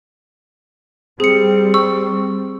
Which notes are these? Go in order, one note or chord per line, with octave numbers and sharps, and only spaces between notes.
G3 C4 G#4 C#7
C#6 E6